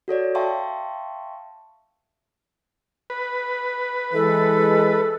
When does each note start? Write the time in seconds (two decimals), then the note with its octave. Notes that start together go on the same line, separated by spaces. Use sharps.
0.08 F#4 A4 C#5 D5
0.35 E5 F5 G5 A5 C6 C#6
3.10 B4
4.13 E3 G#3 A4